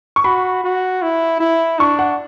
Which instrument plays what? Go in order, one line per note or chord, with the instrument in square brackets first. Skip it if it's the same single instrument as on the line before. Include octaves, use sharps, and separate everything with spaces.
[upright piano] C#6
[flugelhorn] F#4 [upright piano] B5
[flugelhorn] F#4
E4
E4
[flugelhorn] D4 [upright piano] C#6
[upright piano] F#5